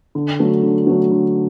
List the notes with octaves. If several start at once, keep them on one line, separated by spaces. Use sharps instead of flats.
D3
F#3 A3
D3
F#3 A3
D3